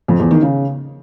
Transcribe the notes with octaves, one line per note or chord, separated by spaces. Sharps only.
F2
E2
D#3
C#3